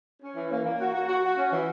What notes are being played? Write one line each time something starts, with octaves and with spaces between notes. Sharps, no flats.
C#4
E3
A#3
A#3
F#4
F#4
F#4
F#4
C#4
E3